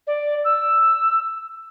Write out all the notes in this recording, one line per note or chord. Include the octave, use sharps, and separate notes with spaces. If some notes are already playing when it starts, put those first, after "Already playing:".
D5
E6